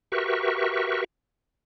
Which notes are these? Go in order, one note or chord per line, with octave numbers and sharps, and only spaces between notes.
F#4 G4 A#4 B4 E5 C#6